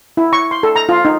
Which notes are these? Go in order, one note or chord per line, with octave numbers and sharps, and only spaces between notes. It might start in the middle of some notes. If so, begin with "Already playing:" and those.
E4
C#6
C6
A4
A#5
F4
D#4